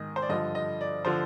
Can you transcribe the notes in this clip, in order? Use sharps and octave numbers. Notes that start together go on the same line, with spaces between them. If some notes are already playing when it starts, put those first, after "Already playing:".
Already playing: G#2 D#3 D#5
C5
D5
G2 D3 F3 D#5
D#5
D5
D3 F3 C5